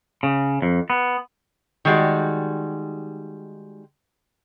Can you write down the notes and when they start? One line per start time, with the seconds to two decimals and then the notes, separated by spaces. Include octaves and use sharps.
0.23 C#3
0.62 F2
0.90 B3
1.85 D#3 G3 G#3 F#4 D5